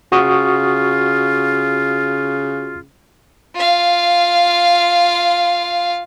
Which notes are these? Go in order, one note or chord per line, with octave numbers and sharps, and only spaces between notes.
C#3 F4 F#4 C#6 D#6
F4 F5